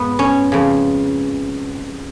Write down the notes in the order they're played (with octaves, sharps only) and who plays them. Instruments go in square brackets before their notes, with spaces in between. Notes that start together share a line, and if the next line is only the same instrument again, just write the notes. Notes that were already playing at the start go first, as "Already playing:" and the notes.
Already playing: [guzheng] G#2 B3
C#4
F2 C#3